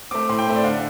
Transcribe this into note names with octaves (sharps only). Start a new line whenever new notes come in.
A3 C4 D6
A2 C6
G5
A3 C4
D5
D3 F5